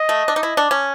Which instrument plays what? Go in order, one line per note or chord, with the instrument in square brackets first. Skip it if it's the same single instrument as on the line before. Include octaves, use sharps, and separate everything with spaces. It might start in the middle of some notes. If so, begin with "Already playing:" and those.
Already playing: [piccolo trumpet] D#5
[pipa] A3
D4
D#4
E4
D4
C#4